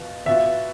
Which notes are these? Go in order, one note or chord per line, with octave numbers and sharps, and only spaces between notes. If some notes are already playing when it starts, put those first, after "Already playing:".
Already playing: E2 B2 B3 F4
E2 B2 B3 F4 E5